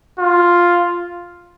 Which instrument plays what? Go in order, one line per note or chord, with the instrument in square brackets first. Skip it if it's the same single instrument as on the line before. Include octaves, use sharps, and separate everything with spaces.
[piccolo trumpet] F4